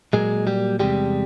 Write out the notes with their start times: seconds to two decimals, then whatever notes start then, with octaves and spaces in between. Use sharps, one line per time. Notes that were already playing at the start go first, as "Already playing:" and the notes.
0.13 A#2 F#3 G#3 A#3 G#4
0.47 G3 G4
0.80 E2 C3 F3 G3 G#3 G4